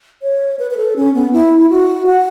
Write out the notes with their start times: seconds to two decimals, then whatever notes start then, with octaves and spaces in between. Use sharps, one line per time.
0.22 C#5
0.59 B4
0.71 B4
0.77 A4
0.96 C#4
1.14 B3
1.33 E4
1.70 F#4
2.07 F#5